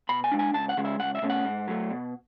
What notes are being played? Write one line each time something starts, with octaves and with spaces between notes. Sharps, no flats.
B2 B5
G#5
G#3 D4
G#5
C#2 A5
F#5
C#3 G#3
E5
C#2 F#5
E5
B2 A3 C#4
F#5
G#2
F#3 A3
B2